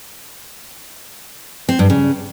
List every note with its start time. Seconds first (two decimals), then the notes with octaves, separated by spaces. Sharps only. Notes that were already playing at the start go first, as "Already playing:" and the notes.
1.69 C4
1.79 G2
1.90 C#3